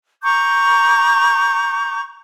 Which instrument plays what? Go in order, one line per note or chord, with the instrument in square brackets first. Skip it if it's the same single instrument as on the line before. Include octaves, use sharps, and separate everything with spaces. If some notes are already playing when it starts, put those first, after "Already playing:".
[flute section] A#5 C#6 D6 G6